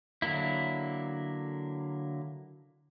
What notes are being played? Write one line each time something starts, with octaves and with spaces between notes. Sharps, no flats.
D3 F#3 A#3 E4